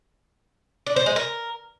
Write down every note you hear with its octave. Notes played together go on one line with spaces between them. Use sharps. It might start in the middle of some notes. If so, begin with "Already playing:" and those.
D4
C5
G#3
A#4